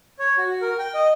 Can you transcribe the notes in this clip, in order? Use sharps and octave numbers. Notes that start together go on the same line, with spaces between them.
C#5
F#4
A#4
G5
D#5